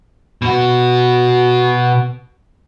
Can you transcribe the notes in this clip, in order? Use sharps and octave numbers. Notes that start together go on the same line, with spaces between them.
B2 F#4